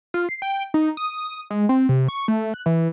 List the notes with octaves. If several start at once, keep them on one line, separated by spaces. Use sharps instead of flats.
F4
C7
G5
D#4
D#6
G#3
C4
C3
C#6
A3
F#6
E3